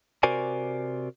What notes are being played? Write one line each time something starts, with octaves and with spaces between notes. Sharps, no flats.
C3 F#4 A#4 C5 D5 G#5